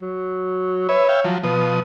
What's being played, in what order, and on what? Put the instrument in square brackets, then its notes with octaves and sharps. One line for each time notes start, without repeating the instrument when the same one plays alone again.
[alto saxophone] F#3
[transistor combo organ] B4 E5 [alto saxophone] C#5
[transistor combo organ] E5 F5 G5
F3 F#3
[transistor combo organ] B2 F3 D#6 [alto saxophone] B4